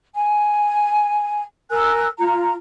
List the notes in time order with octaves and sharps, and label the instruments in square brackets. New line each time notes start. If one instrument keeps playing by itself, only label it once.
[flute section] G#5
A#4 G#5 E6 F#6
F4 A#5